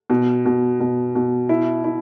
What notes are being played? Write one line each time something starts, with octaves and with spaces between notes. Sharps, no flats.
B2
B2
B2
B2
E4
E4